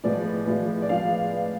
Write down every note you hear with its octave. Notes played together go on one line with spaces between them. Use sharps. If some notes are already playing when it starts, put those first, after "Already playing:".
A2 F3 G#3 B3 D5
A2 F3 G#3 B3
D5
A2 F3 G#3 B3 F5